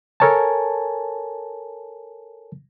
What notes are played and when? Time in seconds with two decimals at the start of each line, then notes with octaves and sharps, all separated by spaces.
0.20 A4 A#4 C#5 G#5 A5